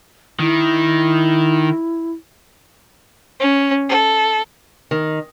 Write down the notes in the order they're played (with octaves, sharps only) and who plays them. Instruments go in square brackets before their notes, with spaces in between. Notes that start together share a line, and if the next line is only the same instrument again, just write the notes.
[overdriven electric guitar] D#3 [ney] E4
[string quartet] C#4
A4
[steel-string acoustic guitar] D#3